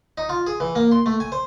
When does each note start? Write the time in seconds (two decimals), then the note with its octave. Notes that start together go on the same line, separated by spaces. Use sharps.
0.18 D#4
0.29 F4
0.47 G#4
0.60 E3
0.75 A#3
0.92 C6
1.06 A3
1.20 G#5
1.32 C5